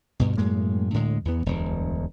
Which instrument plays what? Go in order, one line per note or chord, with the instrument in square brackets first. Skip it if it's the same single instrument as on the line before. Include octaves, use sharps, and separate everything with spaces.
[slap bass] D2 G2 B2
F#2 A2 G#3 A#3
D2 A2 D3 G#3
E2 E3 B3
E1 D2 G2